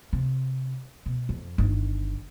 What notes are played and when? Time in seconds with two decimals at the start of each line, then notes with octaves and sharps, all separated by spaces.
0.13 C3
1.06 B2
1.29 F2
1.58 G1 D#3